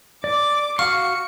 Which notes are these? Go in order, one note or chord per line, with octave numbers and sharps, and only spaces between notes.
D5 D6
F#4 F5 F#5 C#6 F6 C#7